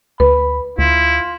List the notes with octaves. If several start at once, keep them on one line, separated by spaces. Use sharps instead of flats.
D2 B4 B5
D2 E4 F4